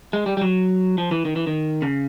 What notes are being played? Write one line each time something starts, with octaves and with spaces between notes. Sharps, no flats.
G#3
G3
G3
F#3
F3
E3
D#3
E3
D#3
C#3